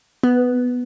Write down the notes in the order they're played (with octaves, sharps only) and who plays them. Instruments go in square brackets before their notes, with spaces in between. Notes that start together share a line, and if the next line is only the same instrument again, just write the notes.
[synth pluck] B3